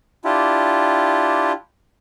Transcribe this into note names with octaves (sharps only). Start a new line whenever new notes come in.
D4 E4 F4 G4